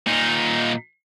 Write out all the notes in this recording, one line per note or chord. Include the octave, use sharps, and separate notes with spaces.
A#2 D#4